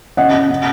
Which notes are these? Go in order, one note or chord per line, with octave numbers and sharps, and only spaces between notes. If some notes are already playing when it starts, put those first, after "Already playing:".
C#3 D#5 F#5
C#3
C#3